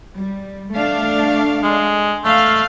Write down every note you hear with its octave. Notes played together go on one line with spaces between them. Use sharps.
G3
A3 D4 F5
G#3
A3 F5